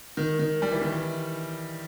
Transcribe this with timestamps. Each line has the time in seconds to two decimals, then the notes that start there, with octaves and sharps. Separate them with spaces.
0.17 D#3
0.39 D#3
0.62 G3
0.71 E3
0.82 D#3
0.92 E3